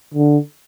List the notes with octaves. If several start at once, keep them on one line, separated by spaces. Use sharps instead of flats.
D3